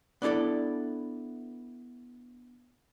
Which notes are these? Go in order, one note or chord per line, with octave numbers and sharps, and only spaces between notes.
B3 D4 E4 A4 D5